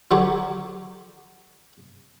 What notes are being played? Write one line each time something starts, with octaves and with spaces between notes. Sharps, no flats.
D3 F#3 G4 C#5